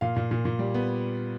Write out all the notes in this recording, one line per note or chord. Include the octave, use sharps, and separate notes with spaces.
A#2 F5
A#2
A#2
A#2
G3
B3